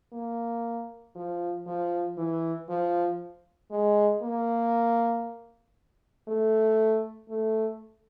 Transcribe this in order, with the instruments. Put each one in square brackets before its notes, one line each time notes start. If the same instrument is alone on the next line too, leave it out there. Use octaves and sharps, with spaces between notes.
[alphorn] A#3
F3
F3
E3
F3
G#3
A#3
A3
A3